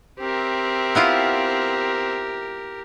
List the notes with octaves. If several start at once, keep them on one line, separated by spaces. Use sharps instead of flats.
C4 G4 A#4 E5
B3 E4 F4